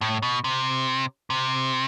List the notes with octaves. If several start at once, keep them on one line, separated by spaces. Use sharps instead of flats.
A2
B2
C3
C3